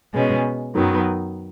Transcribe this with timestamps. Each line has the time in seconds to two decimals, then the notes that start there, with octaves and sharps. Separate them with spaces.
0.13 B2 G#3 C#4
0.75 F#2 D#3 F#3 B3